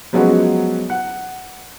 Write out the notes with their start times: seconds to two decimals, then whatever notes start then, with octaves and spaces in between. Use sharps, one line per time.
0.13 F3 F#3 G#3 B3 C#4 F#4
0.90 F#5